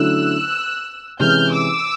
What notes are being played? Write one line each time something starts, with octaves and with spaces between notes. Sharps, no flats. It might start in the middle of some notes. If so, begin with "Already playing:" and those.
Already playing: D3 F#3 A3 C#4 E4 E6 F#6
C3 E3 G#3 C#4 F6 G6
D6 E6